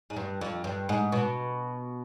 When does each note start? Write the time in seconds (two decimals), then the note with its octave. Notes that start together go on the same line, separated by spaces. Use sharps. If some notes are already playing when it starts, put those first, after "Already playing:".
0.10 G#2
0.16 G2
0.41 F2
0.64 G2
0.89 G#2
1.12 B2